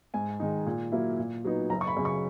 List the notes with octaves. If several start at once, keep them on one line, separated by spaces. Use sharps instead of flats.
G#2 G#5
D#3 G#3 D#4
A#2
F#3 A#3 E4
A#2
F#3 B3 D#4
F#1 A#5
C#6
B5
F#2 C#3
C#6